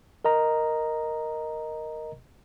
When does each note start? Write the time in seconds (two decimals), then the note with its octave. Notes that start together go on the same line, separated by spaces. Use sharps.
0.25 A#4 D#5 A#5